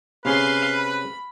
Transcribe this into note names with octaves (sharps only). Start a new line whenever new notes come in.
C3 C#4 G#4 B4 F5 C6
B5